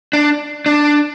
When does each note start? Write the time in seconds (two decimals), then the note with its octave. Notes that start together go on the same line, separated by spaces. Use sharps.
0.13 D4
0.66 D4